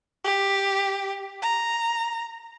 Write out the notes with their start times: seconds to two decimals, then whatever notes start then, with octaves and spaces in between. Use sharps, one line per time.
0.24 G4
1.42 A#5